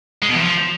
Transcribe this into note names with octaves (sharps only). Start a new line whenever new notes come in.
G#3
B2
E2
F3